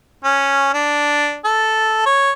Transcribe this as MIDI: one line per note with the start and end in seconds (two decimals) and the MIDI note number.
0.24 0.71 61
0.73 1.38 62
1.45 2.02 69
2.06 2.31 73